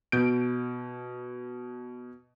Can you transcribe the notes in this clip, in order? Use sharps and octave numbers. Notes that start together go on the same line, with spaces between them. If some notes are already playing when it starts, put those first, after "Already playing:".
B2 G6 D7